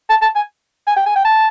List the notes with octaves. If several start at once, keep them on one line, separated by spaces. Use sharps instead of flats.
A5
A5
G#5
G#5
G5
G#5
G5
A5